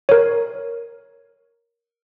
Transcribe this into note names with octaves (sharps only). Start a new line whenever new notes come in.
A#4 C#5